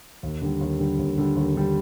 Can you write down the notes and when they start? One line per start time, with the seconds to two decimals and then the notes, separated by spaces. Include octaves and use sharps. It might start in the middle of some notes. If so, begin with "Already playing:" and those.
0.23 D#2
0.42 D3 G3
0.61 D#2
0.79 D3 G3
0.99 D#2
1.17 D3 G3
1.36 D#2
1.55 D3 G3